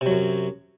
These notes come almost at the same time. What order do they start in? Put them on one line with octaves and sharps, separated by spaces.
C3 F#3 F#2